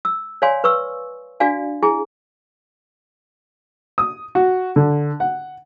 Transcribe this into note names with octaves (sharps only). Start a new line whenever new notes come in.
E6
C#5 D5 F5 G#5 C6
B4 C#6 E6
D4 F#4 D5 F5 G#5
E4 G#4 G#5
D#6
F#4
D3
F#5